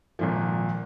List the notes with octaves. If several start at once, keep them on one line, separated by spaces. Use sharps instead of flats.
G#1 A#2 F3